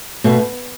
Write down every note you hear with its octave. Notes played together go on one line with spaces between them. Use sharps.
B2 A3